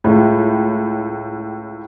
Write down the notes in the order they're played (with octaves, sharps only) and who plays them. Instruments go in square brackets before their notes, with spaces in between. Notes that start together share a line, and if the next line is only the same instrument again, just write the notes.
[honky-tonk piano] C#2 A2